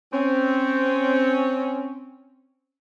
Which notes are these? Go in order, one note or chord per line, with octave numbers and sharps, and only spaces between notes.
C4 C#4